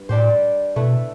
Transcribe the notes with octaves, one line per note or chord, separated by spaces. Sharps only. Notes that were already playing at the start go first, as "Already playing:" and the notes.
Already playing: G2
A2 G3 D4 G4 C5
B2 A3 E4 B4